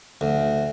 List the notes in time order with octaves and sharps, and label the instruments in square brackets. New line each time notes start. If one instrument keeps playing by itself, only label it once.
[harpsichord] D2